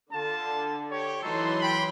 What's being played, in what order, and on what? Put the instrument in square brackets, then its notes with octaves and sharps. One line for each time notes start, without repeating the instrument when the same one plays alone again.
[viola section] D3 [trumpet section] F4 A5
[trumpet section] G4 C#5
[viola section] E3 F#3 C6 [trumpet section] D#4 A4
[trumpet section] G5 B5